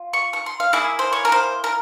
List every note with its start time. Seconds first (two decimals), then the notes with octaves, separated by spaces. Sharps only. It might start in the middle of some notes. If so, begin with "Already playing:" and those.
Already playing: F4
0.13 C#6
0.33 C#6
0.46 C6
0.60 F5
0.73 A#3 E4 G#4 E5
0.99 C5
1.13 C#5
1.25 A#4
1.32 C5
1.64 A#4